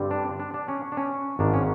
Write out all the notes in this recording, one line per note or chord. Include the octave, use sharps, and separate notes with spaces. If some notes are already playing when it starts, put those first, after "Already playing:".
Already playing: G2 D3 G3 C4
D4
D4
D4
C#4
D4
C#4
G#1 G#2 D#3 D4
C#4